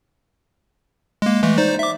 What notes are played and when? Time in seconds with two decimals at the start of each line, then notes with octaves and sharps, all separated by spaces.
1.22 G#3 A#3
1.43 E3 G#3 A3
1.58 D#4 C5 D5
1.79 E5 D6